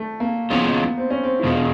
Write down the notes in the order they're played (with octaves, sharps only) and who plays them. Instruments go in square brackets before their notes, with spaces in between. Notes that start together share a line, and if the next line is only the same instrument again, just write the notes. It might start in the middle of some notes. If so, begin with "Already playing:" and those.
Already playing: [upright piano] A3
A#3
[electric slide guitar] E3 G#3 C#4 F4 [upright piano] B3
[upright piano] C4
C#4
C4
E4
[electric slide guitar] E2 B2 G#3 [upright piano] F4